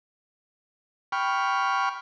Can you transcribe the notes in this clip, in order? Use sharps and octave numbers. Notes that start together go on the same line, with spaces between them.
G5 B5 C#6 F6